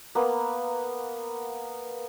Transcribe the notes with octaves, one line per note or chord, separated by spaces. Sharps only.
A#3 B3